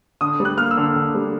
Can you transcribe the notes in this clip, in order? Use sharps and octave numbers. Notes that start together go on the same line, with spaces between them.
D3 D#6
G3
F#6
A#3 F6
E6
D3
D3
G3